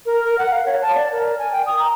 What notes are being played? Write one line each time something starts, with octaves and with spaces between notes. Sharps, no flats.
A#4
A#4
F#5
F5
C#5
A5
D5
A#4
G#5
G5
D#6
A#5